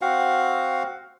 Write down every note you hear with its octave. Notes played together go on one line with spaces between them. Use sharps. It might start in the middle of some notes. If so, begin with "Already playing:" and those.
C4 F#4 F5 F#5